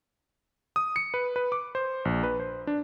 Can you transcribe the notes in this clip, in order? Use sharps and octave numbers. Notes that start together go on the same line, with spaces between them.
D#6
C#7
B4
B4
D6
C5
A#1
B4
C5
D4